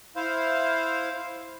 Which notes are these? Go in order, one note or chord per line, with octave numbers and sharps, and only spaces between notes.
E4 C5 F5